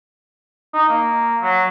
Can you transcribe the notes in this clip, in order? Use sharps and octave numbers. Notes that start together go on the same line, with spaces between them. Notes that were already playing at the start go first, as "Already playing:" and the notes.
D#4
A#3
F#3